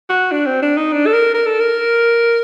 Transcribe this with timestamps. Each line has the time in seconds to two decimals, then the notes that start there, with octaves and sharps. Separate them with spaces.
0.10 F#4
0.32 D4
0.46 C4
0.62 D4
0.77 D#4
0.93 D4
1.07 A4
1.14 A#4
1.34 A#4
1.47 A4
1.60 A#4